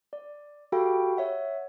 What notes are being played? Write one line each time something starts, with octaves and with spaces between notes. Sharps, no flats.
D5
F#4 G4 A4 F5 G5 B5
C#5 E5 F#5